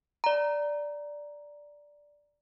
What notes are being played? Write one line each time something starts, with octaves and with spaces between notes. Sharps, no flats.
D5 A#5